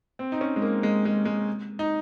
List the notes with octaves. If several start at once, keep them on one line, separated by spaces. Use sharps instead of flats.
C4
D#4
C#4
G#3
A#3
G#3
G#3
G#3
D#4